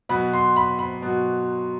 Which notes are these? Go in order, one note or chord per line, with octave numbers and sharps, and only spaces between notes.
B2 F#3 B5
C6
B5
B5
B2 F#3